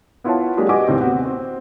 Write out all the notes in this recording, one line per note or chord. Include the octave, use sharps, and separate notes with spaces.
B3 E4 F4 C#5 F#5 A5
F#3 G#3 A#3 D4 G4 G#4
F#4 G4 B4 D#5 G#5 D6
D#2 A2 C3 C4
B3 C4 F#4
C4